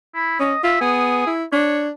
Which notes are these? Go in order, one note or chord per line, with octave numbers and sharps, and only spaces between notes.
E4
C#4 D#5
F4 E5
B3 G#4
E4
D4 C#5